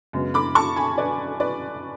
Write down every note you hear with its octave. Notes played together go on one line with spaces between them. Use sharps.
F#2 C#3 G#3 B3
B5 D6
A5 C#6
G#5 B5
B4 D5
B4 D5